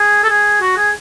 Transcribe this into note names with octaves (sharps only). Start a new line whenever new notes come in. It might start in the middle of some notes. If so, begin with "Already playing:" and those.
Already playing: G#4
A4
G#4
F#4
G#4